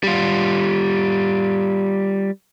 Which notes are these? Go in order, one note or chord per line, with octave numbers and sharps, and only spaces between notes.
G3 F4